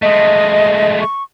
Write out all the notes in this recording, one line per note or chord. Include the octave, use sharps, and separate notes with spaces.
G#3 A3 D#5
C#6